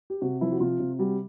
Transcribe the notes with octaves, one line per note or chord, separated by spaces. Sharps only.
G4
C3 F#4
F3 E4
F#4
C3 F4
C3
G3 F#4